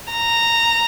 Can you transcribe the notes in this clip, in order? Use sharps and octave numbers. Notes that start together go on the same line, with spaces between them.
A#5